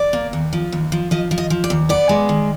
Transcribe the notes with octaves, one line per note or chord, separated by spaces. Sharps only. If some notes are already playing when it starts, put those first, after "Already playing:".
Already playing: D5
A#3
D#2
F3
D#2
F3
F3 D#5
F3
D#5
F3
D5
D#2
B3 D5
G#3
D#3